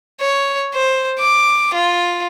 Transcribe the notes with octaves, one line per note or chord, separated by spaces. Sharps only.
C#5
C5
D6
F4